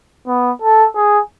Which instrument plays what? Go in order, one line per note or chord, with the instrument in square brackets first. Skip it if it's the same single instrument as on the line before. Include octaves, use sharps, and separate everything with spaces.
[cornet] B3
A4
G#4